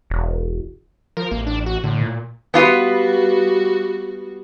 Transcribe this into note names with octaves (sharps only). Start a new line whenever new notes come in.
E1
F3 A#4
A1 A#3
D4
F#4
A2 D3
A#2
G3 B3 F4 F#4 B4